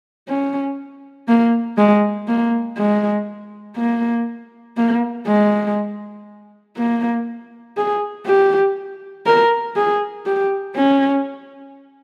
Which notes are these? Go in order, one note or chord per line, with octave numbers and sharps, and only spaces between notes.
C#4
A#3
G#3
A#3
G#3
A#3
A#3
G#3
A#3
G#4
G4
A#4
G#4
G4
C#4